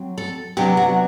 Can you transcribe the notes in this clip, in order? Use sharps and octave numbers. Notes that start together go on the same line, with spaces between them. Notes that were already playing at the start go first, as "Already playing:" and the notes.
Already playing: F#3 C4
A4
C3 F#3 B3 D4 G4
F#4